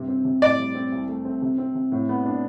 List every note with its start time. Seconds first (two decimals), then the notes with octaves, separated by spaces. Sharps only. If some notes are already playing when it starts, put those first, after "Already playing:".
Already playing: G2 C3
0.08 C4
0.25 C3
0.41 A2 D5
0.59 G3
0.75 C4
0.92 C2
1.08 A3
1.25 C4
1.42 C3
1.58 C4
1.75 C3
1.92 A2
2.09 B3
2.25 D4